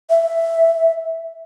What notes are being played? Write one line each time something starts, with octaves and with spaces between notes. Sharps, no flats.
E5